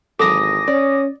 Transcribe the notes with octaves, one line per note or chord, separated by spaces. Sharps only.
G#1 E3 F#3 A4 D6 D#6 A#6
C#4 D5